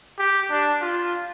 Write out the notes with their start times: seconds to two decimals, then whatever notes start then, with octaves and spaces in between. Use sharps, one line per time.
0.19 G4
0.50 D4
0.81 F4